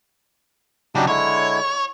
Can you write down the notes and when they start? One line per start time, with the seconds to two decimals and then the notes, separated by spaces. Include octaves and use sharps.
0.95 C#3 F#3 D4 D#4 G4
1.08 D3 G#3 E4 C#5